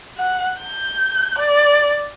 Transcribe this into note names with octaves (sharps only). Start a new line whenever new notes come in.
F#5
G6
D5